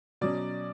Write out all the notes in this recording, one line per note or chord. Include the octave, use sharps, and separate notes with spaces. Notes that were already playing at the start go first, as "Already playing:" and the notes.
B2 F#3 C#4 D5